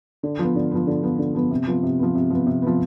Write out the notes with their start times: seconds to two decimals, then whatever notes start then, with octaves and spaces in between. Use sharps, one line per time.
0.23 D3
0.39 F3 B3
0.56 D3
0.71 F3 B3
0.87 D3
1.03 F3 B3
1.19 D3
1.35 F3 B3
1.51 C3
1.67 F3 B3
1.83 C3
1.99 F3 B3
2.15 C3
2.30 F3 B3
2.46 C3
2.62 F3 B3